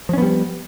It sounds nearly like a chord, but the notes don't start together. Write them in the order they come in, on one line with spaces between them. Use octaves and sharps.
F3 C#4 B3 G3